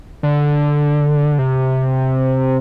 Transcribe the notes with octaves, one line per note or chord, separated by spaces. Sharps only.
D3
C3